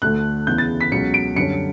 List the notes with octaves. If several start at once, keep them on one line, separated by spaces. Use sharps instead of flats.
D2 D3 A3 F#6
E2 C#3 E3 B3 G6
A6
B6
C#2 B2 F#3 C#4 C#7
D7
F#2 D3 G3 C#4 C#7